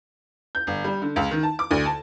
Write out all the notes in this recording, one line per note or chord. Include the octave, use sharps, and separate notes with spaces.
G6
G1
G3
D3
C#2
D#3
A5
D6
D2
A5